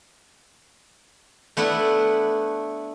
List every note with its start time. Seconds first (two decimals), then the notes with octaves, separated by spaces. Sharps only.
1.57 A3 B3 D4 E4